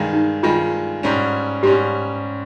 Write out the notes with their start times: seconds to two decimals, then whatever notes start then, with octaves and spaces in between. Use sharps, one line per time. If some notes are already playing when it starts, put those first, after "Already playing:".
Already playing: G2 D#3 G#3
0.13 D#4
0.43 G2 D#3 G#3 F4
1.03 G#2 G3 C#4
1.63 G#2 G3 C#4 G4